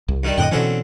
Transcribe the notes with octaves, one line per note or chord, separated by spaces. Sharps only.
C2
G2 D#3 G3
F2 A2 D3 D#5 F#5 G5
B2 D3 E3 C4 C#4